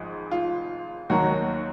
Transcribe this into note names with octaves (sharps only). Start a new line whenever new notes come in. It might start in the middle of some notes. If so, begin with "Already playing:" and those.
Already playing: G#1 G#2 F3
F4
D#2 D#3 F#3 A#3 F#4